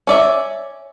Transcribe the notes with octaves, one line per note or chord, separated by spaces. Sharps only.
C#4 D5 E5